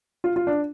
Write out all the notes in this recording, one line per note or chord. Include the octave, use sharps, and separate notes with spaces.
F4
F4
D4